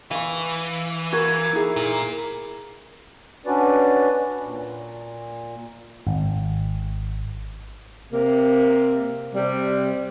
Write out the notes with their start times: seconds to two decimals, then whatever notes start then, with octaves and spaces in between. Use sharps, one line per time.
0.11 E3 F5 C#6
1.13 F#4 A#4 G#6
1.53 D#4 E4 G#4
1.76 A#2
3.46 C#4 D4 F#4 B4 D5
4.44 A#2
6.07 G#1
8.12 C3 A#3
9.34 C3 G3